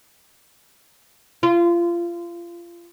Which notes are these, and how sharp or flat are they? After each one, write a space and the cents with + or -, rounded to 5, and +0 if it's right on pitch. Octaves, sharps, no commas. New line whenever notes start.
F4 -25